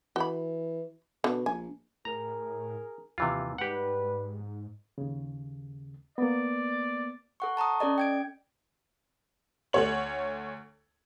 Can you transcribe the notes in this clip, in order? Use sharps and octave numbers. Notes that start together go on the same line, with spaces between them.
E3 F#4 B5
B2 D3
A#1 G#5
A2 G#4 A#4 A#5
D#2 C3 E3 F4
G#2 G3 G4 B4 F#5
D#2 C#3
A#3 B3 D5
A4 F#5 C#6
A5 A#5 C#6 D#6
C#4 A4 D5 D#5
G5 G#6 D7
D2 A3 C#5 F#7